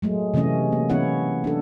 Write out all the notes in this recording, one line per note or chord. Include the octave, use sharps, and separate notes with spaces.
F#3 G#3 A3
C3 E3 A3 C#4 D#5
A#3
E3 B3 C#4 E4 C#5 F#5
D4 A4